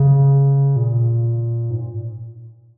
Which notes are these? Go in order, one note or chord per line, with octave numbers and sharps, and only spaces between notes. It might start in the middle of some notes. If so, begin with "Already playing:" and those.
Already playing: C#3
A#2
G#2
A#2